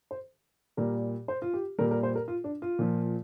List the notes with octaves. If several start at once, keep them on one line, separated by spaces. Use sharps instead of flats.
C5
A#2 G3 A#4
C5
F4
G4
A#2 G3 A#4
A#4
C5
A#4
F4
D4
F4
A#2 F3